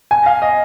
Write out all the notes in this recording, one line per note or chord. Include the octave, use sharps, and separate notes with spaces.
G#5
F5
D#5